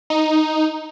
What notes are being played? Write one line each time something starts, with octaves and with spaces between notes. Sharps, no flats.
D#4